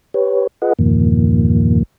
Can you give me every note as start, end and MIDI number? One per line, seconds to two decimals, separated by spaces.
0.14 0.47 67
0.14 0.47 71
0.14 0.47 73
0.62 0.73 65
0.62 0.73 68
0.62 0.73 71
0.62 0.73 75
0.62 0.73 78
0.79 1.83 40
0.79 1.83 43
0.79 1.83 46
0.79 1.83 51
0.79 1.83 53
0.79 1.83 58